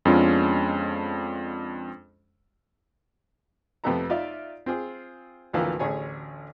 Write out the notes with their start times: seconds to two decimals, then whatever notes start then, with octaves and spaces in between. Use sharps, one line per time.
0.05 F2 G#3 B3 C#4 D4 F4
3.84 F2 C3 A3 B3 A4 A#5
4.09 D#4 F4 D5 E5 F5
4.66 C4 F4 G#4
5.53 G#1 D2 E3 F3 A#3 F5
5.79 A1 D2 D3 G#4 C#5 G#5